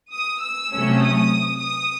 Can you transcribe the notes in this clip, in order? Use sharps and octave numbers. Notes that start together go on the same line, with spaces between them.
D#6
E6
C3 F#3 A3 C#4
D#6
D#6